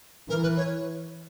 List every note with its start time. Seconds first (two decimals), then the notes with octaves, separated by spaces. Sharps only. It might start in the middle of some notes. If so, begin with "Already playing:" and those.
0.29 E3 A#4
0.43 B4
0.57 C#5